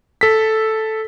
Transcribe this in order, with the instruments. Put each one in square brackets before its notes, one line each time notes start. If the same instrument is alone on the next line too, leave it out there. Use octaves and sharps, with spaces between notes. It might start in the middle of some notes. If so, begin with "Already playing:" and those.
[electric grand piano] A4 B6